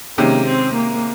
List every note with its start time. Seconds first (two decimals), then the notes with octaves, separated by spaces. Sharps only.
0.18 C3 D#3 G#3 A#3 C#4 G4
0.46 C4
0.75 A#3